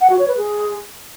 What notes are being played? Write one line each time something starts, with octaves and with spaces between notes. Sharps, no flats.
F#5
F#4
C#5
B4
G#4